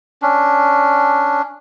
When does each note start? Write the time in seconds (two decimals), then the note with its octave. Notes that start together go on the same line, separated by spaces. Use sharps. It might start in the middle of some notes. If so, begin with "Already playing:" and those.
0.22 C#4 D4